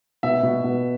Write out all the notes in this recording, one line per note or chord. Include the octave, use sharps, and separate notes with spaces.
B2 E5
B2
B2